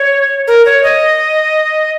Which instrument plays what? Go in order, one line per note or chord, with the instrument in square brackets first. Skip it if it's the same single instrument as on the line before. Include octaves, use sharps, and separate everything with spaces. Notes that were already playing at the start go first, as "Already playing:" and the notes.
Already playing: [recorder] C#5
A#4
C#5
D#5